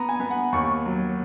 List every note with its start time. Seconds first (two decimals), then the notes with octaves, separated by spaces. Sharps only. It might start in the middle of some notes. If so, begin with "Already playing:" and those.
Already playing: B3 A#5
0.09 G#5
0.20 B3
0.30 F#5
0.52 D#2 C#6
0.86 F#3